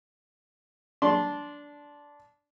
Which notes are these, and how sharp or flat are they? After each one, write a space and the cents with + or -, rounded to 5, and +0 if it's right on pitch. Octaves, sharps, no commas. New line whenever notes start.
D4 -10 C6 +0